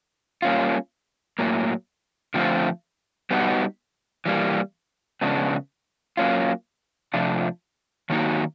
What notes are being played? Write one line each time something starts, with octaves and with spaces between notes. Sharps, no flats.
G3 A#3 C#4 F4
A2 F#3 A#3
D3 F3 A3 C4 F4
G3 B3 D#4 F#4
E3 G3 A#3
C#3 F3 G#3 B3 D4
F#3 A#3 C#4 F4
C3 F3 A3 D4 F4
D#3 F#3 A#3 D#4 F#4